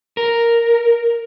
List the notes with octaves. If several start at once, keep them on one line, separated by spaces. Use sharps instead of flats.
A#4